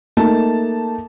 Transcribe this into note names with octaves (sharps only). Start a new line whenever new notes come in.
A3 A#3 D#4 A5